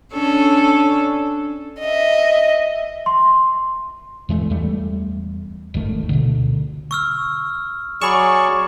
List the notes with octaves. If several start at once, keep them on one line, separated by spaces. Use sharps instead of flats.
C#4 D4 A4
D#5 E5
C6
E2 E3 G#3 A3
E2 G3 A3
D#1 G#1 D#3 A3
D2 B2 D3
C#6 E6 F6
F#3 G#4 D5 B5 C#6 E7